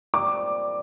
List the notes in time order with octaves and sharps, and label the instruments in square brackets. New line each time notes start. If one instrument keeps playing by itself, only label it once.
[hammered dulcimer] A#2 G3 C4 [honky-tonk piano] D6